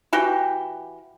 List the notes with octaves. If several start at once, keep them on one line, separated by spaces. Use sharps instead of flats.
E3 F#4 G4 G5